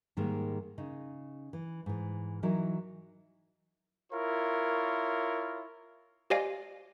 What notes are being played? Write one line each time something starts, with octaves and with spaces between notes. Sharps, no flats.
G#2 D#3 G3 G#3 A#3
C#3 D#4
E3
G#2 E3
E3 F#3 D#4 A#4
E4 F4 A#4 C#5
G4 C5 D5 D#5 F5 G#5